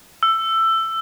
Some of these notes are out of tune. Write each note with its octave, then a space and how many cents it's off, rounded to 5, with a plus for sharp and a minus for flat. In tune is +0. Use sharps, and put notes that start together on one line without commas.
E6 +15